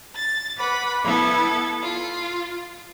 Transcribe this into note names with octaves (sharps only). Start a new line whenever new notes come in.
A6
B4 F#5 B5 D6
B3 E4 A4 G#6
F4